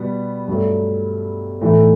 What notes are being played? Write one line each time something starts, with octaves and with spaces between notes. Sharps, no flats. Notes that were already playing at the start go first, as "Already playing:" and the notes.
Already playing: B2 G3 B3
G2 F#3 A3
A2 E3 A3 D#4